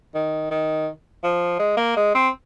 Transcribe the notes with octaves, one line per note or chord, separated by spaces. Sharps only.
D#3
D#3
F3
G#3
A#3
G#3
C4